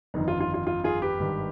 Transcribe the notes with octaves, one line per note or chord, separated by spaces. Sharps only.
G1 F2 D#3 D#4
F4
F4
F4
F4
F4 G#4
G4 B4
G#1 G2 D#3 G3